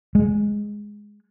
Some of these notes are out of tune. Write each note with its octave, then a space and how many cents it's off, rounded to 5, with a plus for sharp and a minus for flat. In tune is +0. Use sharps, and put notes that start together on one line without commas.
G#3 +0